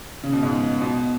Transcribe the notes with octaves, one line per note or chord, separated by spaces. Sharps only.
C#3
B2
G#2
B2